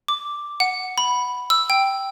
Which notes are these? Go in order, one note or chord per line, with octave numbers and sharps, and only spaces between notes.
D6
F#5
B5
E6
G5